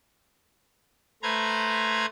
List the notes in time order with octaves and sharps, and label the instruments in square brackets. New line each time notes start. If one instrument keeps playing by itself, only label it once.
[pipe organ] A3 B4 C5 A#5 G#6